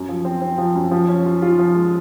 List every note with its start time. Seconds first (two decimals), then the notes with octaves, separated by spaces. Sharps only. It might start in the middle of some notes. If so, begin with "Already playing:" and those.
Already playing: F#2
0.09 F3
0.25 C4
0.42 C4
0.58 F3
0.75 F#2
0.91 F3
1.09 C#4
1.26 F4
1.42 F4
1.59 F3
1.75 G#3